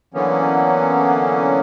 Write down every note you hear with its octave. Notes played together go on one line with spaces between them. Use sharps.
D3 E3 F#3 A#3 B3 C#4